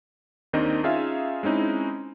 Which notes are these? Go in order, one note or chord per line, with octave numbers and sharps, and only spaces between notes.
D#2 D#3 C4 D4 D#4 D#5
C#4 D#4 F4 G#4 E5 F5
G#3 C4 C#4 D#4 E4